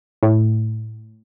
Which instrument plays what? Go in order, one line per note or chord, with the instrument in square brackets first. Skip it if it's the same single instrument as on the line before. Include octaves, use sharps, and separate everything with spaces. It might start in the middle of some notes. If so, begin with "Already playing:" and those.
[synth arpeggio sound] A2